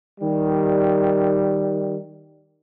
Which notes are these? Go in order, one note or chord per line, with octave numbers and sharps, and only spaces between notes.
D#3 G3